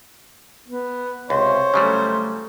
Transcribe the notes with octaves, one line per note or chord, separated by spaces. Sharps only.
B3
C#2 C3 C5 C#5
C#3 F#3 G3 A3